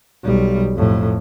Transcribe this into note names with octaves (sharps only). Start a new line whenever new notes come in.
B1 G3
F2 A2